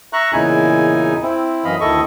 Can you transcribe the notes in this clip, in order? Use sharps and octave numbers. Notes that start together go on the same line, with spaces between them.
E5 A#5 C#6 F#6
E2 A#2 C#3 D#4 E4 G#5
C4 E4
F#2 E3 D#5 F5 B5
D2 D#3 E4 A4 D#5 C#6